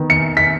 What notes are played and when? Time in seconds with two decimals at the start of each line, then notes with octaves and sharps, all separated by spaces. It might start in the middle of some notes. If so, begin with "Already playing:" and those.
Already playing: D#3 B3
0.10 C#7
0.37 B6